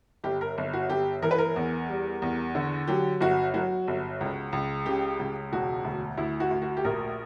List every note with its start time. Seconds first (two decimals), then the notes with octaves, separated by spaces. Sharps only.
0.24 G1 G4
0.41 A#4
0.58 G1
0.73 F#4
0.90 G1 G4
1.23 E3 A#4
1.31 B4
1.39 A#4
1.56 E2
1.89 G3
2.22 E2
2.55 D3
2.87 F#3 G4
3.21 G1 F#4
3.54 F#3 F#4
3.88 G1
4.21 C#2
4.53 C#2
4.86 C#3 G4
5.20 C#2
5.53 E1 F#4
5.84 D2
6.17 D2 E4
6.40 F#4
6.51 D2
6.62 F#4
6.77 G4
6.84 A#1 A#4